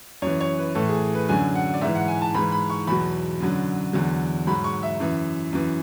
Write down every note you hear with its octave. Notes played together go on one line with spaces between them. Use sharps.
F#2 E3 C#5
C#5
B4
A2 E3 A4
G#4
B4
F#2 D3 F#3 G#5
F#5
D5
G#2 E3 E5
F#5
G#5
A5
G#2 E3 B5
B5
C#6
E2 B2 F#3 B5
F#2 D3 F#3
E2 D3 F#3
G#2 F#3 B5
C#6
E5
F#2 E3
F#2 E3